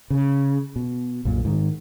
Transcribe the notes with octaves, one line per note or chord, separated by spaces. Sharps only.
C#3
B2
B1 F#2 A#2
G#2 D#3